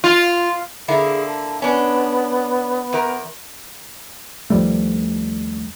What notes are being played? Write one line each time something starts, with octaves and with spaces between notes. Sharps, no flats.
F4
D3 A#3 E4 G#4
A5
B3 C#4 D4
E2 A#4
D#2 F3 G3 A3